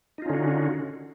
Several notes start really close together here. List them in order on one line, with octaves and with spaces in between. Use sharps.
D#4 F4 C#4 D3 F#4